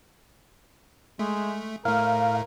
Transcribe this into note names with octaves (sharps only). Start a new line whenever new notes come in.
G#3 A3
A2 A3 A#4 F5